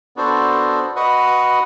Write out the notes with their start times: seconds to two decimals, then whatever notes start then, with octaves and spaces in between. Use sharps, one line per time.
0.16 B3 D4 F#4 A4 C5
0.96 F#4 B4 D#5 F#5